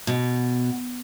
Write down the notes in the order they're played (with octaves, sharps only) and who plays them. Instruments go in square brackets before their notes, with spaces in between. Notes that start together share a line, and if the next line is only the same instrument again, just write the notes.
[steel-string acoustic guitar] B2